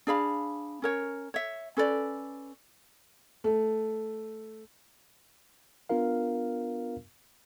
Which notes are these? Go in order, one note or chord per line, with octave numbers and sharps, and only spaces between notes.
D4 G#4 F5 B5
C#4 A#4 C#5
C#5 E5
C#4 A4 B4 D5
A3
B3 D4 F4 A#4 F5